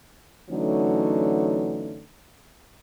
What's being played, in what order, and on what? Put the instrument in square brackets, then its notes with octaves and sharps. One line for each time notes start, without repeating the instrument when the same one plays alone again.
[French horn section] D3 E3 F#3 A3 C#4 D#4